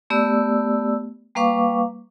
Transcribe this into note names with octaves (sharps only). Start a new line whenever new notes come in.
A3 B3 G4 D5 E6
G3 A#3 B4 F5 C#6 D6